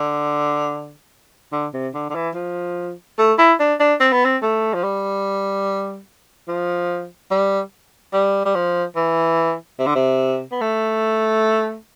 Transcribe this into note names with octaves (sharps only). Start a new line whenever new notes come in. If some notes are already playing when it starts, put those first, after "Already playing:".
Already playing: D3
D3
C3
D3
D3
E3
F3
A3
E4
D4
D4
C4
B3
C4
A3
F3
G3
F3
G3
G3
G3
F3
E3
C3
D3
C3
B3
A3